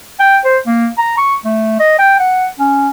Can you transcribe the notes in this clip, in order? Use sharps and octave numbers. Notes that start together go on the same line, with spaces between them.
G5
C5
A#3
A#5
C#6
A3
D#5
G5
F#5
C#4